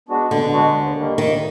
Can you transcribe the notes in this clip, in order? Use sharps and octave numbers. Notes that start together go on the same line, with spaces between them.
G#3 B3 D4 F#4
B2 D3
G#3 B3 D4 F#4
D#2
D#3 G3 A#3
D#2 D#3